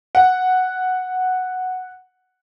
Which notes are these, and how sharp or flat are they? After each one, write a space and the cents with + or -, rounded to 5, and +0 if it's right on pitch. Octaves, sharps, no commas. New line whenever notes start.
F#5 +0